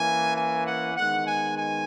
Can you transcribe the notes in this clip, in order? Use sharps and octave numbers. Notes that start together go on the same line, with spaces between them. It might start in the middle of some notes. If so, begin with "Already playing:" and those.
Already playing: E3 A#3 C#4 G#5
G#5
F#5
D#3 G#3 B3 F#5
G#5
G#5